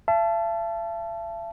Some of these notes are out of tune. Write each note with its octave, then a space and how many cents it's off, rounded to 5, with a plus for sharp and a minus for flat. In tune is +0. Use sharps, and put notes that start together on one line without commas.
E5 +45 A5 -10